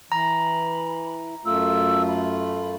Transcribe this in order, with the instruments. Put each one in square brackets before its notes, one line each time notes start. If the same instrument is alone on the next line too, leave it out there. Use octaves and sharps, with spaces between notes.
[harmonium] E3 [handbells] A#5 [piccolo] B5
[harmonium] F#2 A3 F4 [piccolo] E6
[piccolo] B5